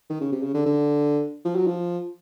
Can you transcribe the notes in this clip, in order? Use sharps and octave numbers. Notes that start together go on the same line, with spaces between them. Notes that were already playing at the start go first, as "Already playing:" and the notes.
D#3
C#3
C3
C#3
D3
D3
F3
F#3
F3